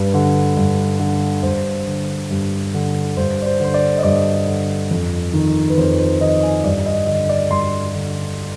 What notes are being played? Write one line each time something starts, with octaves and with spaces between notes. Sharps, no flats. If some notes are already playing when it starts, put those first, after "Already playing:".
Already playing: G2 B4
D3
G2
D3
G2 C5
D3
G2
D3
G2 C5
D5
C5
D3 C5
D5
D#5
G2 D5
D3
F2
D#3
B4
F2 C5
C5
D#3 D#5
G#5
G2 D5
D#5
D3 D#5
D5
G2 C6
D3